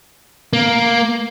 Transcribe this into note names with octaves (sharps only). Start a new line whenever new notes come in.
A#3